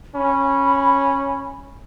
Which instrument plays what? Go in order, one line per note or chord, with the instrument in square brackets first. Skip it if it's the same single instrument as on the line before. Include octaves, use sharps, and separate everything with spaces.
[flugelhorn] C#4 [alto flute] B5